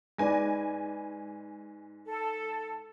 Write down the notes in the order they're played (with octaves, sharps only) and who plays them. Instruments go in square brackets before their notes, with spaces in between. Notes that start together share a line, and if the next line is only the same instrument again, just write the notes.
[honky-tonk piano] G#2 G#5 A#6 [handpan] G#3 B4 D5
[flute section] A4